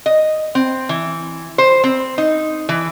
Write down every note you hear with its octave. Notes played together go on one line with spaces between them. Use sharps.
D#5
C4
E3
C5
C4
D#4
E3